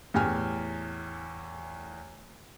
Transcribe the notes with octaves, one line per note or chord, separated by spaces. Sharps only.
E2 A2 G4 G#5 F6